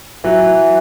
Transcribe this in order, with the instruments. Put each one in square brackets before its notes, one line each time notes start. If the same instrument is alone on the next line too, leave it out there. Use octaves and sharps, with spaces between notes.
[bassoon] E3 [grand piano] F#3